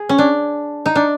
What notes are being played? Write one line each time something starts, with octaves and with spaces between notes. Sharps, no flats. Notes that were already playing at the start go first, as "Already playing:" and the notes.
Already playing: G#4
C#4
D4
D#4
D4